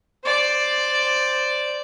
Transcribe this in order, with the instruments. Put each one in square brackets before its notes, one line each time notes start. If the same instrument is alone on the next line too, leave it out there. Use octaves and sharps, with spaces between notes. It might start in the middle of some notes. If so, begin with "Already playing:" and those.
[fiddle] C5 D5